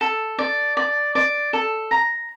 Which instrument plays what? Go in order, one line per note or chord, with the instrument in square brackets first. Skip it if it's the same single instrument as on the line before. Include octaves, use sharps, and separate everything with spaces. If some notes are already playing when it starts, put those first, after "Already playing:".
[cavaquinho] A4
D5
D5
D5
A4
A#5